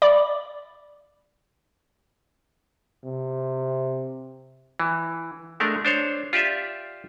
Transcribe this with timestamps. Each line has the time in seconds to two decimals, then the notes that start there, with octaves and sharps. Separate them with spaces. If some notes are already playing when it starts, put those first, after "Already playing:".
0.02 D5 B5 D6
3.04 C3
4.80 E3
5.60 G#3 A3 D4 A#4
5.85 D4 C5 C#5
6.33 F4 G4 D5 E5